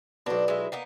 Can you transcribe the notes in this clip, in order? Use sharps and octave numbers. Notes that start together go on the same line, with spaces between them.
B1 B2 F3 D4
G#3 E4
A#3 B3 D#4